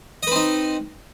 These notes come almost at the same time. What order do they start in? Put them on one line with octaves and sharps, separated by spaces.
D#5 B4 C4 D#4